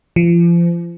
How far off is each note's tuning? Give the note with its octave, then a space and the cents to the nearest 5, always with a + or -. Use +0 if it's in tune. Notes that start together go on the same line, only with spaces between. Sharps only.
F3 -35